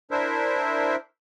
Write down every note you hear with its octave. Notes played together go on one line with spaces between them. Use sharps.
D4 E4 A#4 C5 E5